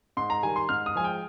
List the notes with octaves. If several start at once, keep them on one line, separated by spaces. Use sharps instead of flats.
G#2 C6
A#5
D#3 G3 G#5
C6
G#2 F6
D#6
F3 G#3 G#5
G5